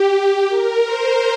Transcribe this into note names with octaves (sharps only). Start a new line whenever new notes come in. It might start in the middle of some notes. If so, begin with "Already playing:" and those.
Already playing: G4
A#4
C5